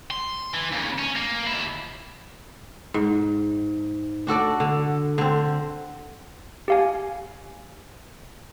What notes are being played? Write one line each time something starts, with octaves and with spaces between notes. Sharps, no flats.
C6
E3
D#2 C#3
C#4
A#3
D#2 E4
G#2
D4 F#4 A4 D5
D3
D3 C4
G4 F5 G#5